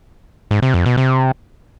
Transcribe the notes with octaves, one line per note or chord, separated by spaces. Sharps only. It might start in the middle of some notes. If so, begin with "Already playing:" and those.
G#2
C3
F2
B2
C3